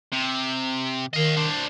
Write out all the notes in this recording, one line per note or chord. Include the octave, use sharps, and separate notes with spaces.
C3
D#3 D#5 F5
D4 C5